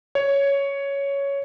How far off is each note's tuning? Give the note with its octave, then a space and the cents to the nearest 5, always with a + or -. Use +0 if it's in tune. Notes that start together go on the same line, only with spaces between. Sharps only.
C#5 +10